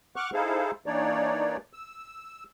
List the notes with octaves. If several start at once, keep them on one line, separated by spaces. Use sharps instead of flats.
F#5 C#6 D6 F6 F#6
D#4 E4 G#4 A4 C5 F5
E3 A#3 D4 D#4 C#5 D5
E6